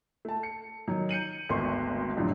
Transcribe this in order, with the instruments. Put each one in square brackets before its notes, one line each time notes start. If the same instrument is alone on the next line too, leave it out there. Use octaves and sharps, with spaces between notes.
[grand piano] A3 A5
C#7
D#3 F#3
G6 C#7 D#7 F#7
G#1 D2 A3 B3 C6 C#6
C2 F2 A2 D3 F#3